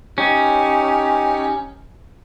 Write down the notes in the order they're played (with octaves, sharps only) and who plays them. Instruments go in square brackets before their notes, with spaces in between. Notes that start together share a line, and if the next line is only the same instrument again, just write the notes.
[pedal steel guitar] C#4 [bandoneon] D#4 G4